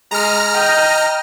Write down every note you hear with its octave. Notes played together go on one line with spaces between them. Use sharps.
G#3 A#5 F6
D#5 G5